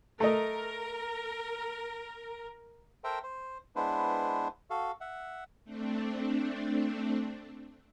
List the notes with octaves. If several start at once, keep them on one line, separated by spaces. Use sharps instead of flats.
A3 A#4 D#5
A4 A#4 C5 E5 G5 A#5
C5
G#3 B3 D4 E4 B4 C5
F#4 A4 F5
E5 F#5
A3 C4 D4